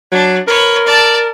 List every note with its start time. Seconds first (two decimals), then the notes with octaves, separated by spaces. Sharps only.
0.12 F#3 D4
0.48 A#4 B4 C#5
0.86 D5 A5